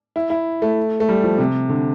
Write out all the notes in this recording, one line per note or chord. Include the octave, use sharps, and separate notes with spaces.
E4
E4
A3
A3
G3
F3
C3
D3